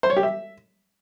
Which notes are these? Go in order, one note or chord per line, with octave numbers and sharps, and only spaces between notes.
C5
C#5
G4
E5